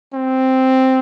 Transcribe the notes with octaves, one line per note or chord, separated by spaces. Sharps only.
C4